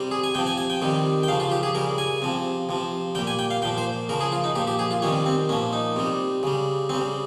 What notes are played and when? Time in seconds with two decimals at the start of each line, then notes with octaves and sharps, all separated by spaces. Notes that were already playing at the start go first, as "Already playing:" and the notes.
Already playing: C3 G3
0.11 G#4
0.24 G#5
0.35 C3 F3 G5
0.47 G#5
0.58 G#5
0.70 G5
0.82 C3 D#3 G3
1.23 G5
1.28 C#3 F3 F5
1.40 F4
1.51 G4
1.63 G#4
1.75 C#3 G3 A#4
1.98 G#5
2.22 C3 F3
2.69 C3 F3
3.15 G3 G5
3.18 A#2
3.27 G#5
3.39 G5
3.51 F5
3.62 A#2 G5
3.65 F3
3.78 C5
4.09 C#3 F3 A#4
4.21 G#4
4.32 F4
4.44 D#4
4.56 A#2 F3 G4
4.67 G4
4.79 G#4
4.91 F4
5.02 C3 D#3 G3 C#4
5.26 C4
5.49 A#2 F3 C#4
5.73 D#4
5.96 C3 G3
6.43 C#3 G3
6.89 C#3 G3 C4